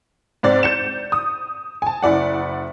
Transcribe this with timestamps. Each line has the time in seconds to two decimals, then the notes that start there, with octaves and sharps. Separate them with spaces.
0.43 G#2 C4 D5 A6
0.63 G6 C#7 E7
1.12 D#6
1.82 G#5 A5
2.03 F#1 E4 D5 F#5